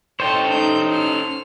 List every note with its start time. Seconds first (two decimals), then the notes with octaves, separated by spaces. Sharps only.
0.20 C#4 A4 C5 C#5 D#5 G5 A5
0.49 A3 D#4 G6
0.91 F6